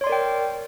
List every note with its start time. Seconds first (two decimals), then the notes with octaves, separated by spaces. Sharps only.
0.01 C#5
0.04 C6
0.07 D5
0.10 A#4
0.12 G5